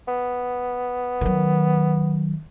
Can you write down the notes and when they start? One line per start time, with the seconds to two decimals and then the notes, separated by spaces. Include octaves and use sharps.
0.08 B3
1.21 D#3 F#3